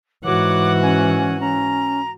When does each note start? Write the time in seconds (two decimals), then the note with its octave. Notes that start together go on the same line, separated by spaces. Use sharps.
0.24 G#2 E3 F#4 C#5 F#5 D6
0.83 C#4 G#5
1.39 C#4 A#5